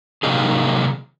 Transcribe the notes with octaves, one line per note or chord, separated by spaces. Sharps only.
C3 D#3 F#3 A#3 D#4 G#4